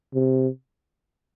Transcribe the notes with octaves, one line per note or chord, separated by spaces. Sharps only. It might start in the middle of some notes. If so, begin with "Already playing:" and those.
C3